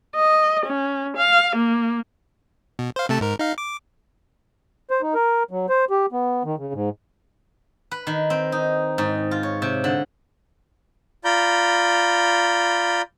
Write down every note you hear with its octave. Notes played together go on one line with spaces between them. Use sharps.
D#5
C#4
F5
A#3
B2
C5 F5
C3 A3 A5
G#2 A#4
D#4 F5
D6
C5
D#4
A#4
F#3
C5
G4
B3
D#3
C#3
G#2
B4
D#3
C4
D#4
G#2
F4
C#5
C3
D3
F4 D5 A#5 B5 G6